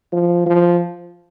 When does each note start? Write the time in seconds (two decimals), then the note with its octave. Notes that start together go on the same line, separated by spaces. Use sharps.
0.13 F3
0.46 F3